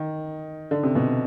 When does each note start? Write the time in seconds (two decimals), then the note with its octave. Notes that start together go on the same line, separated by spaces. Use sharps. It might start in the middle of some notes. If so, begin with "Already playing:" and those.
Already playing: D#3
0.71 D3
0.83 C3
0.95 B2